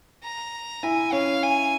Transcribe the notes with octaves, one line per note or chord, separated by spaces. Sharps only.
A#5
E4 G#5
C#4 F5
G#5